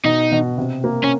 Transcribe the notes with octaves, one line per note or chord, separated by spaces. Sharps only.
B2 D#4
B2
C3
A#3
C#4